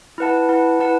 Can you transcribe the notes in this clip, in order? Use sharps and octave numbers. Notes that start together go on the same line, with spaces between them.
E4 B4 F#5 A5
E4 B4 F#5 A5
E4 B4 F#5 A5